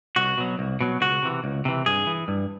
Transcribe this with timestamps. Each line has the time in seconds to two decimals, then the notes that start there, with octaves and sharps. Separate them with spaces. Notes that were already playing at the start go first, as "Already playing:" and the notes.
0.16 C2 F#4
0.38 B2 F#3
0.59 C2
0.81 B2 F#3
1.01 C#2 F#4
1.23 C3 E3
1.44 C#2
1.65 C3 E3
1.86 G2 G#4
2.07 E3
2.28 G2